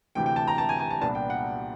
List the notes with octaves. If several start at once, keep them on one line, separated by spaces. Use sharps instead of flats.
D2 C3 E3 G5
G5
A5
A#5
A5
G#5
G#5
A5
C2 A#2 G3 B3 D4 A5
G5
F#5